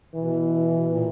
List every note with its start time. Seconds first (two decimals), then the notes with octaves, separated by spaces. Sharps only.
0.14 B2 E3
0.76 B2
0.90 A#2